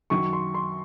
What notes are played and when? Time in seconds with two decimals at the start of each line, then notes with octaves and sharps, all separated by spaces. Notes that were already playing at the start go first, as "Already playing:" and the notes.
0.10 F#2 D#3 F#3 C#6
0.33 C6
0.54 C6